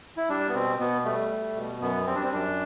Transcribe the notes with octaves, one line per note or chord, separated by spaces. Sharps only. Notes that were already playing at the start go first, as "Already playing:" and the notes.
E4
G3 D4
B3
B2 C4
B2 B3
G3 A3
G3
B2
F#2 B3
G3 C4
D4
C4
F#2 D4